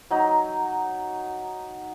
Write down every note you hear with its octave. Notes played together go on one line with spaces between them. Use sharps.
F#3 D#4